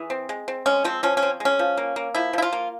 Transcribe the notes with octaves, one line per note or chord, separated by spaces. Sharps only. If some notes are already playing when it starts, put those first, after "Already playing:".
Already playing: E3 G#4
C4
G#3
C4
G#3 C#4
F3 C4
F3 C#4
C#4
C4
G#3
C#4
F3
A#3
A#3
F3 E4
F3 E4
F4
A#3